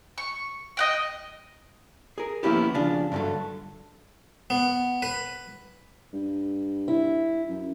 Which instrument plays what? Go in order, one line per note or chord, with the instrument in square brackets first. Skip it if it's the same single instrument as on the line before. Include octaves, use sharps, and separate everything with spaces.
[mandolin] C#6
D#5 F#5 G5
[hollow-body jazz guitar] G#4 A#4
F3 A#3 B3 C#4 E4 G4
C#3 F3 D4 F4
G2 D3 D#3 F#3 A3
[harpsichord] B3
B4
[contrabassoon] G2
[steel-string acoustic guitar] E4
[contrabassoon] F#2